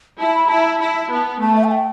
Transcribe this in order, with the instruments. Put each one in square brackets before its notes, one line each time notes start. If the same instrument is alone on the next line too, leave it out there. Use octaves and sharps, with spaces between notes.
[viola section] E4 [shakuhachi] A5
[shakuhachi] B5
[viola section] E4 [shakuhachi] A5
[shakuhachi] B5
A5
[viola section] E4
B3
[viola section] A3 [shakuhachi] A5
[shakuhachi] E5
A5
G5